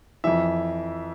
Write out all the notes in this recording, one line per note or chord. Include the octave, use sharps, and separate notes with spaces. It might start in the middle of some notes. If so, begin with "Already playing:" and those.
F2 E3 E5